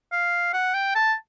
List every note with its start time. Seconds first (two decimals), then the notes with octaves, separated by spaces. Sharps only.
0.12 F5
0.53 F#5
0.74 G5
0.95 A5